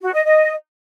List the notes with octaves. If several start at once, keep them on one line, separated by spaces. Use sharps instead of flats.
F#4
D#5
D#5